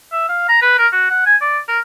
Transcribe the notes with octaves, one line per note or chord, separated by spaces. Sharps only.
E5
F5
A#5
B4
A#4
F#4
F#5
G#5
D5
A#4